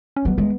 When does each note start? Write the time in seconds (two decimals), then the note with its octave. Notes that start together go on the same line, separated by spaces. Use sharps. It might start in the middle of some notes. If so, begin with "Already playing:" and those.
0.16 C#4
0.25 F#3 B3
0.38 G#3